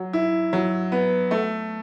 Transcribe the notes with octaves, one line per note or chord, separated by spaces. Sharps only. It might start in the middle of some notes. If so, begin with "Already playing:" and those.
Already playing: F#3
E4
F#3
B3
A3